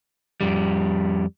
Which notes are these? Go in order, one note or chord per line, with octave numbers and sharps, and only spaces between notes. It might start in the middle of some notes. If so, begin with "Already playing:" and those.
F2 G3